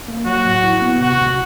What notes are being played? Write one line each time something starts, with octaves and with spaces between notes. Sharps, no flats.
A#3
F#3 F#4
A2
E4
B3
C3 F#4
C#2